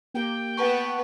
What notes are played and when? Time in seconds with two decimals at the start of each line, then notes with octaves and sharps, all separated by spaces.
0.14 A#3 G4 G5
0.57 B3 B4 F#5 A5 C#6